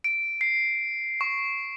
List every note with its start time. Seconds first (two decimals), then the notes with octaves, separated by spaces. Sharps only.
0.04 D7
0.41 C7
1.21 C#6